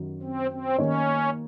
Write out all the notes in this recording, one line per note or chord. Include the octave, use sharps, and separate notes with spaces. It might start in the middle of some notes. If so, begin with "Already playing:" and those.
Already playing: F#2 D#3 F#3
C4
C4
D#3 A#3 C#4 D#4 A#4 C#5